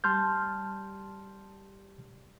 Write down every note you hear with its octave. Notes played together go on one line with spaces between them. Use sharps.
G3 A5 C6 F6 G6